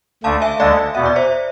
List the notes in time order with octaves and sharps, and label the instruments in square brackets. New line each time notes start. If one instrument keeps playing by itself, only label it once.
[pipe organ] D2 D3 A3 D4 [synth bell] F5 A5
[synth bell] E5 G#5
[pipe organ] D2 D3 G#3 D4 [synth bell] D5 F5
[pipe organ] E2 B2 B3 [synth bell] E5
[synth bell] D5
C5 E5